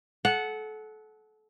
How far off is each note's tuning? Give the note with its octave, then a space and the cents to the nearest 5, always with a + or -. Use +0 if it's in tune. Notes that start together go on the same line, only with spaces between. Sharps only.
A4 -30 F#5 +0